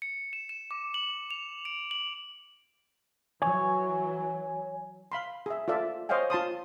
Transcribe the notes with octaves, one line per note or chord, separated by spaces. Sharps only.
C#7
E7
E7
D6
F#7
F7
D7
F#7
E3 F#3 C#5 G#5
F5 B5 C6
G#4 E5
F4 A4 D5 E5
C5 C#5 D#5 F5 G5 G#5
F4 A5 C6 D#6